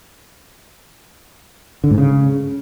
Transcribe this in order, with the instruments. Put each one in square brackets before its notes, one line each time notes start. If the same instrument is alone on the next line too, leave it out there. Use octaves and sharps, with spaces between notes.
[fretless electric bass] D3
G#2
C#3